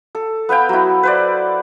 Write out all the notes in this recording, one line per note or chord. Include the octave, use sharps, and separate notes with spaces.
A4
B3 B4 F5 G5
F#3 E4
B4 C5 D5